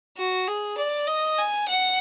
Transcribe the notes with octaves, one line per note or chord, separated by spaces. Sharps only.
F#4
G#4
D5
D#5
G#5
F#5